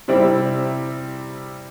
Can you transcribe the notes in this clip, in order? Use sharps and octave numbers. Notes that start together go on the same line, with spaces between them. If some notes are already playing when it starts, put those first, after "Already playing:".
C3 G3 C4 E4